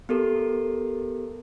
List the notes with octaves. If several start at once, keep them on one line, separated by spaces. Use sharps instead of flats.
B3 G4 A4 A#4